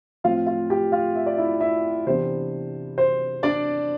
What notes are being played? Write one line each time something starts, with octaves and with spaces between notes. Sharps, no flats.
A2 F3 C4 F4 F5
F4 F5
G4 G5
F4 F5
E5
D5
E4 E5
E4 E5
C3 E3 B3 D4 C5
C5
D4 D5